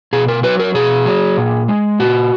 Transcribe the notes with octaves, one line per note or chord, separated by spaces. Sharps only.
B2 G#4
A#4
F#3 B4
A#4
B2 G#4
F#3
A#2
G#3
A#2 F#4